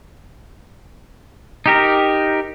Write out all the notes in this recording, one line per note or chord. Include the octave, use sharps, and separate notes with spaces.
D#4 G4 A#4